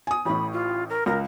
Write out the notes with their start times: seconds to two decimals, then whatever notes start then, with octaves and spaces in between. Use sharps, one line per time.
0.07 G#5 D#6
0.25 A1 A2 B5
0.52 F4
0.89 A#4
1.06 C#2 A#4